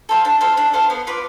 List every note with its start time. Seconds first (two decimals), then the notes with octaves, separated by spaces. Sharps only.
0.09 A4 C5 F5
0.25 D4
0.41 A4 C5 F5
0.57 D4
0.73 A4 C5 F5
0.90 B3
1.07 F4 B4 D5